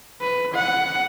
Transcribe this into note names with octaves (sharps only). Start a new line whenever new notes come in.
B4
F#5